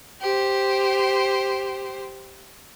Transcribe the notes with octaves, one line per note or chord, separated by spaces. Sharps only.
G4 C5